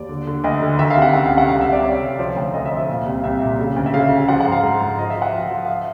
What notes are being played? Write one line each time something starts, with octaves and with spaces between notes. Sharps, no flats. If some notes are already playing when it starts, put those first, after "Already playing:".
Already playing: D#2 D5
D3
D3
D2 D#5
D3
D#3 E5
F5
C3
F#5
C#2 F#5
F5
C3
F#5
C2 F5
E5
C2
D5
C2 C#5
C2
F3 C#5
D2
D2 D#5
E5
F3
E5
A#2 F5
C2
F5
C2 E5
A#2
C#3
D2
E5
C#3 F5
C#3
F3 F#5
F#5
G#2
F5
G#2
G#2
F3 D#5
E5
F3
F#5
F3 F5
F3
F5
E5